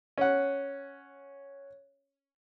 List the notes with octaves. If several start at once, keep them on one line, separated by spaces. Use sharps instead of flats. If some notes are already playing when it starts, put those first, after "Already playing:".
C#4 F#5